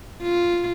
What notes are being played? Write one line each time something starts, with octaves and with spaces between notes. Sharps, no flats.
F4